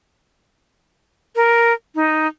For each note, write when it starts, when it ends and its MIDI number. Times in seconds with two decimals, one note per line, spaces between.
1.36 1.73 70
1.95 2.27 63